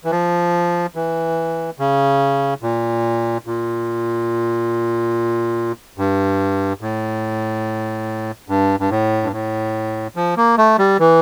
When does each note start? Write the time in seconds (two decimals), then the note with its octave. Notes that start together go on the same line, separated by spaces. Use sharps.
0.05 E3
0.11 F3
0.95 E3
1.79 C#3
2.62 A#2
3.46 A#2
5.98 G2
6.81 A2
8.48 G2
8.80 G2
8.90 A2
9.23 G2
9.32 A2
10.16 F3
10.37 A#3
10.58 A3
10.78 G3
10.99 E3